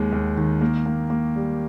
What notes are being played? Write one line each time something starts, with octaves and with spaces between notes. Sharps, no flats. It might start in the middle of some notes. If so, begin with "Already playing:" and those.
Already playing: D#2 G#3
D#2
D#3
A#3
A#3
A#3
G3